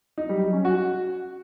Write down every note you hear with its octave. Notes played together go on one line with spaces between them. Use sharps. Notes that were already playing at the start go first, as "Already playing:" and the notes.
D#4
G3
F#3
C#4
F#4